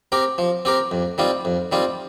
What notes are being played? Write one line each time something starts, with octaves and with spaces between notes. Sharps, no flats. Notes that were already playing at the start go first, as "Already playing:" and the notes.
C4 G4 A#4
F3
C4 G4 A#4
F2
D#3 G3 C4 F4
F2
D#3 G3 C4 F4